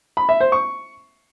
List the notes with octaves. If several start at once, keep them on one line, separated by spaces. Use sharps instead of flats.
B5
E5
C5
C#6